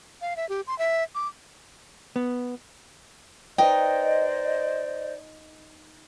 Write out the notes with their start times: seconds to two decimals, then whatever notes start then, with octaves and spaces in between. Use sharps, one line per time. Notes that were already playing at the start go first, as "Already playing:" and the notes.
0.21 F5
0.36 E5
0.49 G4
0.67 C6
0.79 E5
1.15 D6
2.16 B3
3.58 D#4 B4 C5 D5 D#5 G5